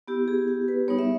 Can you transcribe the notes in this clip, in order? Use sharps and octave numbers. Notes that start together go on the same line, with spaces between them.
B3 E4 G4
G#4
G4
B4
G3 B3 D#4 C#5
E5